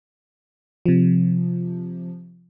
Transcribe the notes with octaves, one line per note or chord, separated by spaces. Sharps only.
C3 F3